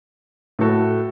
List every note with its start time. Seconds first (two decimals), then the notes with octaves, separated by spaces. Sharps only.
0.59 A2 A3 F#4 A4